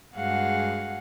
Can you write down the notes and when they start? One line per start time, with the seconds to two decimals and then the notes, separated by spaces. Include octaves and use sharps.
0.15 G2 G#3 F#4 G#4 F5 F#5